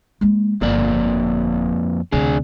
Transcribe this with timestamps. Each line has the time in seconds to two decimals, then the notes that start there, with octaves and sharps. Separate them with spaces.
0.21 G#3 A#3
0.61 G1 F2 A#3 D5
2.12 D2 C3 D4 G#4